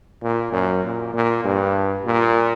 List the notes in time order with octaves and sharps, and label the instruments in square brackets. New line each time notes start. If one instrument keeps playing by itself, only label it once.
[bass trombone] A#2
F#2
A#2
A#2
G2
A#2